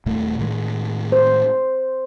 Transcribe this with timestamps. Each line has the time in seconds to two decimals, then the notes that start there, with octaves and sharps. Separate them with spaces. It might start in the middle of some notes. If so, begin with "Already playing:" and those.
0.06 D#1 A#2 A3
0.39 A2 D#3 G#3
1.12 C5